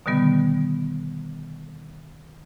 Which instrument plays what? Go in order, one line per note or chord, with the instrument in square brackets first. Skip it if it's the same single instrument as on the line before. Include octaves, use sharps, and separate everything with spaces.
[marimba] B2 D3 D#3 G3 B3